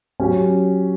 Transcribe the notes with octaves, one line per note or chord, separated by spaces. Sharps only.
F#3 C#4 G4